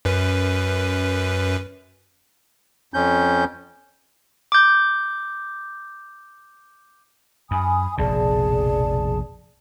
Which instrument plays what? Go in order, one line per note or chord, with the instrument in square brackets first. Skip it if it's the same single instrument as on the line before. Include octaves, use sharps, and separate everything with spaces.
[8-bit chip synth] F#2 B4
[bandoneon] F2 C#4 G6
[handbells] D6 G6
[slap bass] F#2 [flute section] G#5 B5 D#6
[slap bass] F1 A#1 B2 [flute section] G#4 D5 A5